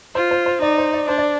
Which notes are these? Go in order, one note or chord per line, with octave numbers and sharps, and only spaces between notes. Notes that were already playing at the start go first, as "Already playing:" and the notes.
F4 C5
C5
C5
D#4 D5
C5
D5
D4 C5
D5